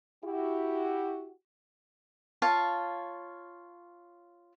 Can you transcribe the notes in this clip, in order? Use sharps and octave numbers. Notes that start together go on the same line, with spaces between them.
E4 F#4 G4
F4 C#5 F5 A5